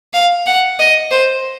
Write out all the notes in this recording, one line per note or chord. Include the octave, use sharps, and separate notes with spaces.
F5
F#5
D#5
C5